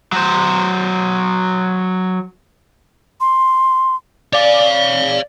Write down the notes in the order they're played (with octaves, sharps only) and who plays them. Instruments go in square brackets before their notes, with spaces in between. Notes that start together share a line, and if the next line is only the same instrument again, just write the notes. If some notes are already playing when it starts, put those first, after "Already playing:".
[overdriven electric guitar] F#3 C5
[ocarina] C6
[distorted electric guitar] C#5 F5 [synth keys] D5